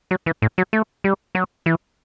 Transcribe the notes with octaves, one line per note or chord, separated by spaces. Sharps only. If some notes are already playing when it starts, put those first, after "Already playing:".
F#3
E3
A2
F#3
A3
G3
F#3
E3